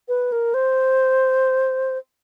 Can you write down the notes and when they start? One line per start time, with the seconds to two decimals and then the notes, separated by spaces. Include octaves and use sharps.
0.08 B4
0.32 A#4
0.54 C5